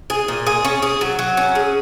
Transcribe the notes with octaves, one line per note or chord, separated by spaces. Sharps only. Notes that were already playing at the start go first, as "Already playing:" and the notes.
G#4
A#2
G#4
C#4
G#4
F#3
F#3
C#4
G#4